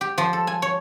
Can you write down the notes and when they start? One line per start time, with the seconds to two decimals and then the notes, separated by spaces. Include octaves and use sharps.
0.01 G4
0.18 F3
0.33 A4
0.47 G#5
0.62 C#5